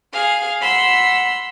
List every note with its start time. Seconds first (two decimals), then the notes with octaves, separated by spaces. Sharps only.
0.12 G#4 F5
0.61 F#5 B5 C6 E6